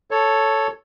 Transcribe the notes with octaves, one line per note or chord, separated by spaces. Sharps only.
A4 C#5